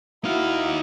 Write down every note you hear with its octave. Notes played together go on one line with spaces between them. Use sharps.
D#4 E4 F#4 F5